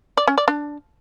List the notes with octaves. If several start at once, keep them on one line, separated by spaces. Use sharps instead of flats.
D5
C#4
D5
D4